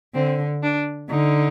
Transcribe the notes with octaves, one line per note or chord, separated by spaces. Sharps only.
D3 C4
D4
D3 D#4